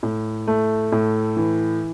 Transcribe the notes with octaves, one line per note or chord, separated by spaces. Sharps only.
A2
A3
A2
E3